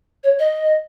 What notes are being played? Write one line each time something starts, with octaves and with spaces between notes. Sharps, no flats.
C#5
D#5